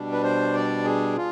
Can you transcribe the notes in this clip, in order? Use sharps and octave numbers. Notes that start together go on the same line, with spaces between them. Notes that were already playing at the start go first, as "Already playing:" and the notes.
Already playing: B2 G3 D4
B4
C5
D5
G#4
F4